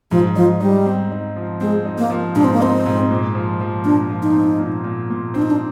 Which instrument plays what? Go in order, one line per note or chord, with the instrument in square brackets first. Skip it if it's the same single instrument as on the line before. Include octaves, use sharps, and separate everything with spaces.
[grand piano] G#2 [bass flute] F3
[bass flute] F3 [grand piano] D#4
[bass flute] G3 [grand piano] D#4
[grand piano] C4
D#4
F3
[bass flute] G#3 [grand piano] C4
[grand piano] D#4
[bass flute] A#3
[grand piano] F3
[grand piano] G#2 [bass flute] D4
[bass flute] C4
A#3
[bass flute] C4 [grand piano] D#4
[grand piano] G#2
A#2
F3
F3
[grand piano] A#2 [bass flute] D4
[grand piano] F3
[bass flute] D#4
[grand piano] C4
A#2
A#2
A#2
[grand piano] C4 [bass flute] D4
[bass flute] D#4
D4